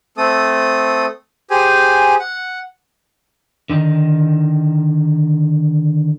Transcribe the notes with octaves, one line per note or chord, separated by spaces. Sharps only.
A3 C4 A4 D#6
G4 G#4 C5 G#5
F#5
D3 D#3 D#4